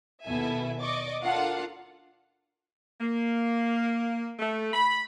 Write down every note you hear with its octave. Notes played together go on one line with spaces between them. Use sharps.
D#2 B2 E4 A4 E5 G#5
D5 D#5 C#6 D6
D4 F4 A4 A#4 F5 F#5
A#3
A3
B5